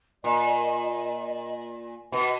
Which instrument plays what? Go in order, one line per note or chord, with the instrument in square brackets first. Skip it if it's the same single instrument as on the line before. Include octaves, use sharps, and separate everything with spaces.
[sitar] A#2 [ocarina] D#5
[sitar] B2 [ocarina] B4